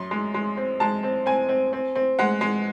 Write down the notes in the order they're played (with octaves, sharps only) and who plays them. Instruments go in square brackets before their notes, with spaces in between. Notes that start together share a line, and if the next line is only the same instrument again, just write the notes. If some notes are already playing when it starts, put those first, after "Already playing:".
Already playing: [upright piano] F#2 C6
G#3
G#3
C4
G#3 A5
C4
C4 G#5
C4
C4
C4
G#3 F#5
G#3